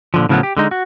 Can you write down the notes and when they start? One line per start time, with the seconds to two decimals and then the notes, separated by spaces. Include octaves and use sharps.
0.14 A#2 D3 F3
0.29 A2 C#3 F3 F#3 A3 B3
0.43 G4
0.57 D3 G#3 D#4
0.71 F#4